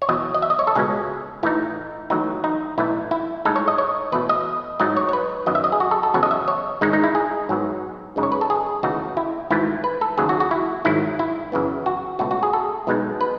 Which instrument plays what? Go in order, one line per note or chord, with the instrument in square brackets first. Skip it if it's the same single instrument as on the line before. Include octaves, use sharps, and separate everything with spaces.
[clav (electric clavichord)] C#5
E2 B2 F#3 D#5
D#5
E5
D#5
C#5
A4
C#2 B2 G#3 C#4 G#4
A2 E3 A3 D#4 E4
A1 A2 F#3 B3 D#4
D#4
B1 A2 E3 A3 E4
E4
A2 G#3 D#4 A4
C#5
D#5
C#5
E2 B2 A3 B4
D#5
G#2 F#3 A3 D#4 D#5
C#5
C#5
B4
F#2 D#3 F#3 B3 D#5
E5
D#5
G#4
F#4
A4
A4
E2 C#3 F#3 B3 C#5
D#5
E5
C#5
G#2 D#3 G#3 D#4
D#4
E4
G#4
G#2 F#3 B3
F#2 C#3 G#3 D#4
C#5
B4
A4
G#4
D#2 C#3 E3 A3 D#4 F#4
E4
G#1 G#2 E3 A3 E4
B4
A4
D#2 C#3 F#3 G#4
F#4
F#4
E4
G#1 G#2 D#3 F#3 E4
E4
F#2 C#3 E3 B3
F#4
C#2 B2 A3 F#4
F#4
G#4
A4
B1 B2 G#3 B3 D#4
B4